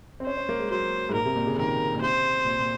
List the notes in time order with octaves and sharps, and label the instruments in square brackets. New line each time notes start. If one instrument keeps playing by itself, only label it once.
[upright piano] C4
[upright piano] C#4 [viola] C5
[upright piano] C#4
A#3
G#3
[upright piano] F#3 [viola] C5
[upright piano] G#2
[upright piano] A#2 [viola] A#4
[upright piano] C3
A#2
C#3
[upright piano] D#3 [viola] A#4
[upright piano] A#2
[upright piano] C3 [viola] C5
[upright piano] A#2
A#2